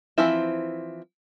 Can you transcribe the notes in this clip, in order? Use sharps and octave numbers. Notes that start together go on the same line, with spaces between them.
E3 F3 C4 E4